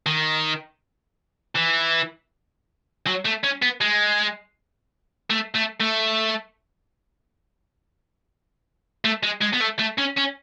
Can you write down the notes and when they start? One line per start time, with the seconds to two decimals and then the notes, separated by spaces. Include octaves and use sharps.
0.06 D#3
1.56 E3
3.06 F#3
3.25 A3
3.43 C#4
3.62 B3
3.81 G#3
5.30 A3
5.55 A3
5.81 A3
9.05 A3
9.23 G#3
9.42 G#3
9.54 B3
9.61 A3
9.79 A3
9.98 C#4
10.17 C#4